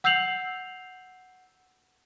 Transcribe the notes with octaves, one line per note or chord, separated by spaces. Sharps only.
F#5 E6 G6 C7 F7 F#7